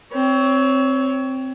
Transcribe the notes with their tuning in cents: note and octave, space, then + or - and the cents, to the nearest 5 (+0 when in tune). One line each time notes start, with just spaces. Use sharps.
C4 +0 C#5 +25